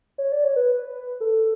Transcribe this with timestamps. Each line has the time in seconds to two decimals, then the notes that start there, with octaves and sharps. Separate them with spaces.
0.18 C#5
0.32 D5
0.44 C#5
0.56 B4
1.20 A4